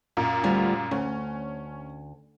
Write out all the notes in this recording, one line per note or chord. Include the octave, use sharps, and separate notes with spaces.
F#2 A#2
D2 G3 F4
D2 C#4